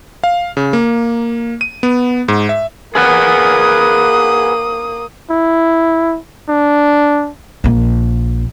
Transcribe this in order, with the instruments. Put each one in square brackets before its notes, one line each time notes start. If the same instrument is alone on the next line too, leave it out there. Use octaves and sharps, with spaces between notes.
[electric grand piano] F5
C#3
A#3
D#7
B3
G#2
E5
[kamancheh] A#3 D#6 [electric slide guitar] G#4 B4 F#5
[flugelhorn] E4
D4
[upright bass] A#1 A#3